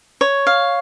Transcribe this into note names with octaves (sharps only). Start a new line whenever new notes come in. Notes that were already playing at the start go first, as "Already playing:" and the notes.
C#5
F5